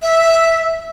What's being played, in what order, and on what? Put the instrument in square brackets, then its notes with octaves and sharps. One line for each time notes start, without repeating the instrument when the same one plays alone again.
[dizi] E5